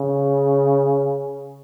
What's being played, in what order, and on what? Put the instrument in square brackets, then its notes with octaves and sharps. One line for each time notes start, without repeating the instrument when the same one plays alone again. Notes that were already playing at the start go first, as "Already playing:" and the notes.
Already playing: [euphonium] C#3